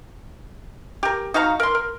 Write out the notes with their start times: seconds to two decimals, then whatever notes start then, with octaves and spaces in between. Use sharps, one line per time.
1.03 G4 A#4
1.34 D#4 F#4 F5 A#5
1.60 A#4 C6
1.75 A#4